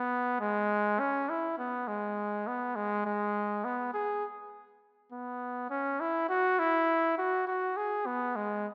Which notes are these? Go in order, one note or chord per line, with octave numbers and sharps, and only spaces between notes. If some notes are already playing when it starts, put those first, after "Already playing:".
Already playing: B3
G#3
C#4
E4
B3
G#3
B3
G#3
G#3
B3
G#4
B3
C#4
E4
F#4
E4
F#4
F#4
G#4
B3
G#3